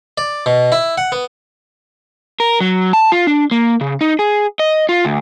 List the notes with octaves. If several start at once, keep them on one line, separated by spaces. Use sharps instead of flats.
D5
B2
E4
F#5
B3
A#4
F#3
A5
F4
D4
A#3
C#3
D#4
G#4
D#5
F4
D2